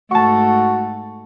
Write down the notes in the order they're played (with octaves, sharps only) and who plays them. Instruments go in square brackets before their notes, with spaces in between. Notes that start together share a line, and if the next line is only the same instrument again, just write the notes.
[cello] G#2 A3 [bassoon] F#4 [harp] A5 C#6